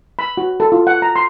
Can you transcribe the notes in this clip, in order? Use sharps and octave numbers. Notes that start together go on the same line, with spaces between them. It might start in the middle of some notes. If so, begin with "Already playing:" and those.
B5
F#4
A4
F4
F#5
A#5
C6